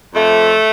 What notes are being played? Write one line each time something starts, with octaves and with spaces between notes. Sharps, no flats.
F2 A3